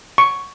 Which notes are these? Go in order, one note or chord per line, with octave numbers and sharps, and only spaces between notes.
C#6